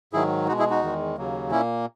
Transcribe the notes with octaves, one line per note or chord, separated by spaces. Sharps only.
G#2 D#3 F#3 E4 G#4
B2 G#3 D#4 F#4
E4 G#4
D#4 F#4
E2 D#3 G#3
D#2 C#3 F#3 A#3
A#2 A#3 C#4 E4